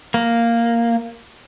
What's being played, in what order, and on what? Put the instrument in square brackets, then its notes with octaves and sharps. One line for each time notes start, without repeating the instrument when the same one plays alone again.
[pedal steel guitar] A#3